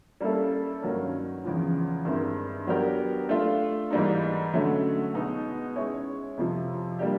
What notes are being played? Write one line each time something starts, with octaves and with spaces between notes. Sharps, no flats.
G3 A#3 C#4 E4 A4
G2 D#3 F#3 A#3 C#4
E2 C#3 F3 G#3
G2 D#3 G#3 C4 E4
F#3 B3 D4 G4 A#4
A3 D4 F4
G#2 E3 G3 A#3 D#4
D3 F#3 A3 C#4
B2 G#3 B3 D#4
G#3 C#4 E4 G#4 C#5
F2 C3 F3
G3 A#3 D4 G4